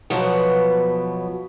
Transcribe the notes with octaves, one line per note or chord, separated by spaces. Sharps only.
B2 F3 F#3 B3